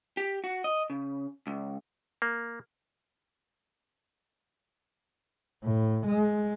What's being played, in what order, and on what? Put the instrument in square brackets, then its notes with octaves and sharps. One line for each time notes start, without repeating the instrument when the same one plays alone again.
[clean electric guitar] G4
F#4
D#5
C#3
C#2
[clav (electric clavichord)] A#3
[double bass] A2
G#3